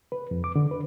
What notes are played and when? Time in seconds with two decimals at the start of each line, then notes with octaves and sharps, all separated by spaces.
0.12 B4
0.31 F2
0.44 D6
0.56 D3
0.71 B4